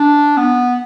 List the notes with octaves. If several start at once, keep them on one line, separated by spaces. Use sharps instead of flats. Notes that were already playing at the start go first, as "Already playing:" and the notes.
Already playing: D4
B3